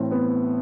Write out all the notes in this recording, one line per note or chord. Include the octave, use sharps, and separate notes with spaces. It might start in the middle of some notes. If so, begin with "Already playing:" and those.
Already playing: A2 E3 C4
B3